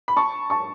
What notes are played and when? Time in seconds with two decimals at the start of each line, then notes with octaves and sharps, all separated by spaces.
0.08 B5
0.16 A5 C#6
0.50 A5 C#6